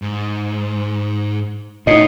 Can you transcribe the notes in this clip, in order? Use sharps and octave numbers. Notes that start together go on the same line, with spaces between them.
G#2
A2 D#4 F4 F#4 D#5